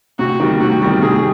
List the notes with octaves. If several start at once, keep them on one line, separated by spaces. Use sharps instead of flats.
C3 F#4
D#3 G3
C3 F#4
D#3 G3
C3 G#4